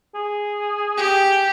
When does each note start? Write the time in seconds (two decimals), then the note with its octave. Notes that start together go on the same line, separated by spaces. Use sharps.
0.15 G#4
0.97 G4